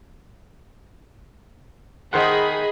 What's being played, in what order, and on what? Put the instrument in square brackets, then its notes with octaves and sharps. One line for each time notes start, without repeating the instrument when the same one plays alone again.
[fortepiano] D#3 C5 F#5 [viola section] G#4 D#5 B5